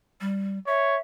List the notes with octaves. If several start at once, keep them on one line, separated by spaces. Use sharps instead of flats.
G3
C#5 E5